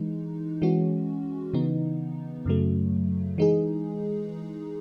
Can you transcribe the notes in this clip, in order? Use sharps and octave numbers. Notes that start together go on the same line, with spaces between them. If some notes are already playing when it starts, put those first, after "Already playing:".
Already playing: E3 G#3 D#4
E3 G#3 C#4 F#4
C#3 E3 B3 D#4
F#2 C#3 F#3 A3
E3 G#3 D#4 G#4